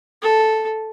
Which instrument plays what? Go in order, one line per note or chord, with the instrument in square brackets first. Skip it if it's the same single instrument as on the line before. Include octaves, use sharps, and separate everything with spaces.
[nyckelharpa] A4